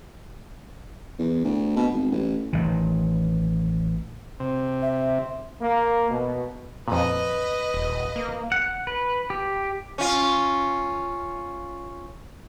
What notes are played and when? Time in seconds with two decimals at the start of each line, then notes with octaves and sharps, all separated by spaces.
1.19 E2
1.44 D2
1.76 B2
1.93 G#1
2.12 A1
2.53 A1 D#3
4.40 C3
4.82 E5
5.62 A#3
6.10 B2
6.88 F2 A#2 B4 D#5
7.74 D#1
8.16 A#3
8.52 F#5
8.87 B4
9.30 G4
9.98 C#4 F4